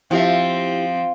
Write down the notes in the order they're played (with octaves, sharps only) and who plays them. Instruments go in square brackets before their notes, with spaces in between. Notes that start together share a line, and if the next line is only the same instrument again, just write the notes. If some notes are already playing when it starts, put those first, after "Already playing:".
[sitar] F3 [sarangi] C4 [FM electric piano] E4 G4 [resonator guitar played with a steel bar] E5 G5